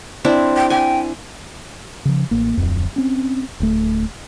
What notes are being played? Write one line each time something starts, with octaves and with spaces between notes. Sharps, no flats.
C4 D4 E4
G5
G5 G#5
C#3 F3
A1 A#3
D1 G1 F2
C4 C#4
D1 A3